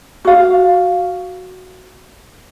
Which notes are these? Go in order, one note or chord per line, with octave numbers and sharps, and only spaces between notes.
F#4 F5